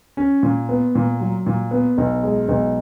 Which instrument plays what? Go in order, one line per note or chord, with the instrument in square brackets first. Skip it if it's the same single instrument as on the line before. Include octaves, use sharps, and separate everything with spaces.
[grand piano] C#4
A#2
B3
A#2
F#3
A#2
B3
B1
G#3
B1